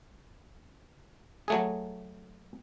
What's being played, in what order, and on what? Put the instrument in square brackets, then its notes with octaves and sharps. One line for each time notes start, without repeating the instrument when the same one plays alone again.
[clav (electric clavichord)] F#3 A3 G#4